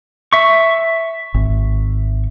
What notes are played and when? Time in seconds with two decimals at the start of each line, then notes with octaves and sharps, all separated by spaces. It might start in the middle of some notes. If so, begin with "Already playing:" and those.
0.33 E5 C#6
1.34 G#1